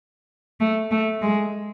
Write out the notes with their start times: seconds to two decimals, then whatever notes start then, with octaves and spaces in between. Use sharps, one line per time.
0.60 A3
0.91 A3
1.22 G#3